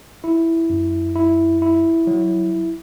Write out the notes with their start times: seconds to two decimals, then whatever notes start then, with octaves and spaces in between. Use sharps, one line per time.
0.24 E4
0.70 F#2
1.15 E4
1.62 E4
2.07 F#3